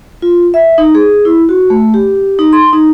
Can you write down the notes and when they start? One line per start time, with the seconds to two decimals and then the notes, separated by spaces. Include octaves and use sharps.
0.22 F4
0.54 E5
0.78 D#4
0.95 G#4
1.25 E4
1.49 F#4
1.70 A3
1.94 G4
2.39 D#4
2.53 C6
2.73 D#4